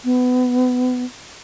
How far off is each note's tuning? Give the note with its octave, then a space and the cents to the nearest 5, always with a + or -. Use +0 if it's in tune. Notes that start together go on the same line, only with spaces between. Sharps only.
B3 +25